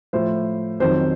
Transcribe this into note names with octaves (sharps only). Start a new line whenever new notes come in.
A2 F3 C5
F2 D#3 F#3 C5